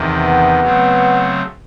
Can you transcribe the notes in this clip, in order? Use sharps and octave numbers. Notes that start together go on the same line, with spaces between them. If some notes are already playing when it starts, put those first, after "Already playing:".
Already playing: E2 C3 D#3
B3
C#3 F#3 A3 C4